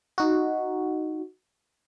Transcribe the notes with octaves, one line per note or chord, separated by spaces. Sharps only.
D#4 F#4